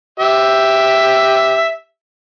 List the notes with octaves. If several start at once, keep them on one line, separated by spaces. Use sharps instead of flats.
G4 E5